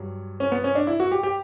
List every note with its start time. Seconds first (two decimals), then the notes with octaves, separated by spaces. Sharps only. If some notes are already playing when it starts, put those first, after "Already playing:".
Already playing: G2 F#3
0.40 C#4
0.52 B3
0.64 C#4
0.75 D4
0.87 E4
1.00 F#4
1.12 G4
1.23 G4